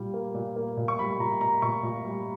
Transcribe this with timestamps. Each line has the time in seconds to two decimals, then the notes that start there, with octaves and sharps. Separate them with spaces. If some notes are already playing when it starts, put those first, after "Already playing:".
Already playing: A#2 G3
0.14 A#3
0.35 A#2
0.56 A#3
0.77 A#2
0.88 C#6
0.99 G3 B5
1.20 A#2 A#5
1.40 A#2 A#5
1.62 A#2 C#6
1.83 A#2
2.05 G3